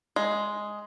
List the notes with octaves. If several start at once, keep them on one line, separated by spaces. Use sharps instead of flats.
G#3